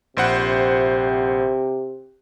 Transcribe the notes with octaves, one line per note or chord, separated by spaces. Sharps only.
A#1 C3 C5 F#5